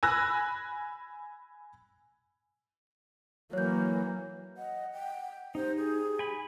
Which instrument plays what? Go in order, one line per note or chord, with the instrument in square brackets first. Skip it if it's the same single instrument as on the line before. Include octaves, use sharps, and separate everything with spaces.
[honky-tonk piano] G#5 B5 E6 F#6 A#6
[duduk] E3 [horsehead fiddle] F#3 [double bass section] A#3 [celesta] C#5 G6
[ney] D#5 [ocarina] F#5
[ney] G5
[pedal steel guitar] D#4 [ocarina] G4 [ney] C5
[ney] G#4
[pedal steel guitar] G#5 B5